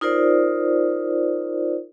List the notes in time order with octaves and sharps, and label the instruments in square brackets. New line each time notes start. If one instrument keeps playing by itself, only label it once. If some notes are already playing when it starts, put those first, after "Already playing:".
[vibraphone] D#4 F4 A#4 C5 D5